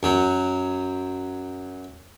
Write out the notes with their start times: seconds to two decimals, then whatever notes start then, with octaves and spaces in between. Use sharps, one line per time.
0.03 F#2 F#3